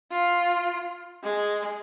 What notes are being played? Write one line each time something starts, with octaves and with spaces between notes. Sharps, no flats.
F4
G#3